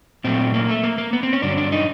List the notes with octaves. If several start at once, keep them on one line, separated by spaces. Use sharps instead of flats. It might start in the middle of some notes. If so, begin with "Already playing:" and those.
A#2 F#3 A3 C4
A#3
A3
A#3
A#3
B3
C4
C#4
G2 D3 F#3 D4
D4
D#4